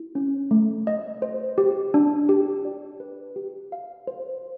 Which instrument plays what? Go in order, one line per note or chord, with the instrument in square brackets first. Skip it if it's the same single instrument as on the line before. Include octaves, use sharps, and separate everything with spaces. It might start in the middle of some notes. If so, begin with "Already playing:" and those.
Already playing: [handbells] E4
C#4
A3
D#5
C5
G4
D4
G4
D5
B4
G4
F5
C5